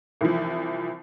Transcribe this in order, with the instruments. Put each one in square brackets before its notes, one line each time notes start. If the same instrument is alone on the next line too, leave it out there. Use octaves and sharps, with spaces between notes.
[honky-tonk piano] C2 E3 F3